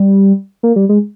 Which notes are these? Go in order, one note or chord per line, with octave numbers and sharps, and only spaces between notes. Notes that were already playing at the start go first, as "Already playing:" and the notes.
Already playing: G3
A#3
G3
G#3